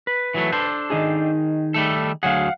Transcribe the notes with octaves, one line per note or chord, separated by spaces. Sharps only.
B4
E3 F#3 A3
D4 A4 C5
D#3 D#4 G#4
G3 A3 A4
D2 F#3 G#4 F5 F#5